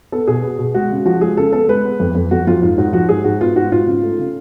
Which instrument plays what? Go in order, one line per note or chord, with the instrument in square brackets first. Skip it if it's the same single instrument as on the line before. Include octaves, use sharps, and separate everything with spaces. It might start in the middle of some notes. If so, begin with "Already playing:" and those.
[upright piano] B3 A4
B2 G#4
B3
B2
G#3 F#4
C#3
F3 F#4
G#3 G#4
C#3 A4
B3 A4
G#3 B4
B3
F2
F2
F2 F#4
F2 F4
G#2 F4
G#2 F#4
F3 F#4
G#2 G#4
G#2 F#4
B3 F4
G#2 F#4
G#2 F4
C#3
A3
C#3